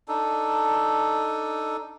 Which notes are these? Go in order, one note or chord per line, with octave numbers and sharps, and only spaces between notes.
D4 D#4 A4